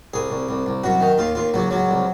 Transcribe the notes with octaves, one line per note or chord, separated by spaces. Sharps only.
C2 G#4
C2
C2
C2
F#2 F#4
D#3
D#2 F4
D#2 F4
C#2 F#3
C#2 F#3
C2